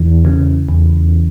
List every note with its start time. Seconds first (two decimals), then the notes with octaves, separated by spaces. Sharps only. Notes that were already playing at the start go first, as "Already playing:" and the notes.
Already playing: E2 E3
0.25 C#3
0.69 E2